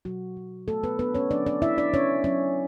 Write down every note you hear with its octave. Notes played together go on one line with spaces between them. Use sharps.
B2 F#3 F#4
F#3
A3 B3 A4
B3 B4
B3 D4 B4
C#4 C#5
F#3 D4 D5
D4 D5
B3 E4 E5
D4 D5
C#4 D4 C#5
F#3 C#4 C#5